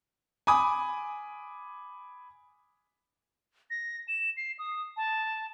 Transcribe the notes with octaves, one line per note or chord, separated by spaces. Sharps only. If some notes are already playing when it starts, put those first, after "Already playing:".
G#5 B5 D6 D#6
A#6
E7
C7
D#6
A5